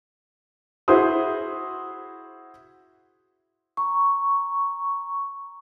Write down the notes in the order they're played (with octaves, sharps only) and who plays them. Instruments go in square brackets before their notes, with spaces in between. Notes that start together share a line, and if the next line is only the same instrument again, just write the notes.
[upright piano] E4 F#4 G#4 C5 C6 D#6
[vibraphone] A#5 C#6